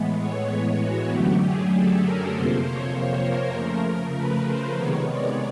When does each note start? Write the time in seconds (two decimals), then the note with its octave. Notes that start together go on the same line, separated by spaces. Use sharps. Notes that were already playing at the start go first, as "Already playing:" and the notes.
Already playing: A2 E3 G#3 B3
0.20 C#5
0.82 F#4
1.12 F#2 D3 F#3 A3 G4
1.42 G#4
1.73 A4
2.03 A#4
2.34 F2 C3 F3 A#3 C5
2.64 C#5
2.94 C5
3.24 A#4
3.55 C#3 F3 A3
4.17 B4
4.47 C5
4.77 C3 D#3 G#3 B3 C#5
5.08 D5